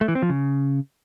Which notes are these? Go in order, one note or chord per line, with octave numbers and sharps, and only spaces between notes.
A3
E3
C4
F3
C#3